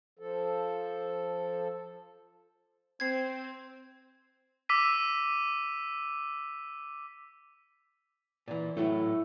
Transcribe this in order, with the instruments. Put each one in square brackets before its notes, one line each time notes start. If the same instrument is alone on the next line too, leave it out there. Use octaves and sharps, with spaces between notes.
[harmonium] F3 A4
[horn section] C4 [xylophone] G#6 C7
[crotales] D6 E6 B6 D#7
[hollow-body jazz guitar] A#2 E3
[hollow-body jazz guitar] A2 F#3 A3 [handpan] E4